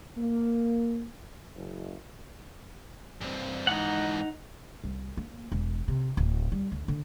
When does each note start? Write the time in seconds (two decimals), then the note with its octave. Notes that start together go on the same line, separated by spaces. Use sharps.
0.17 A#3
1.55 F#1
3.21 G2 C4
3.67 G#2 E3 D#4 F#5
4.84 C2
5.17 A#3
5.52 E1
5.88 C3
6.17 D1
6.52 G3
6.72 D2
6.88 D3